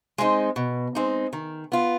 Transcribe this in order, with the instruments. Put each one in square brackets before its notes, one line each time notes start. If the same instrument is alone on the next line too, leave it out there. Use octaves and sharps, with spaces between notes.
[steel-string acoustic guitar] G#3 C4 D#4
B2
G#3 C4 D#4
D#3
B3 F4